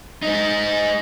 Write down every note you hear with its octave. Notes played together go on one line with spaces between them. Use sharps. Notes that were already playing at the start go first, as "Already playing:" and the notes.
G#3 D#4